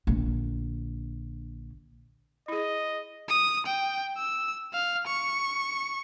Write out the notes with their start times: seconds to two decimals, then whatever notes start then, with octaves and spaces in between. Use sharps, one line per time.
0.07 A#1 D3
2.48 E4 G#4 D#5
3.29 D#6
3.66 G5
4.17 E6
4.74 F5
5.06 C#6